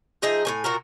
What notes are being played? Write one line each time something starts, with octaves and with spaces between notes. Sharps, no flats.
F3 D#4 G#4 E5
A2 A#3 G#5
A#2 F#4 A#4